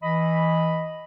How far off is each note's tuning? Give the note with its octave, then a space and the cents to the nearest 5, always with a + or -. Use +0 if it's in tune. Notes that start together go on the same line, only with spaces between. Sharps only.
E3 +0 D#5 +0 B5 +0